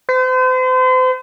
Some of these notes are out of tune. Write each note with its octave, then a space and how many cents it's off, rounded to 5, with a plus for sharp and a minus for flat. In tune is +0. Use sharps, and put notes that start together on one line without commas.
C5 -40